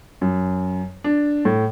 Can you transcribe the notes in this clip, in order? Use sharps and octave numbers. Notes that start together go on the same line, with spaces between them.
F#2
D4
A2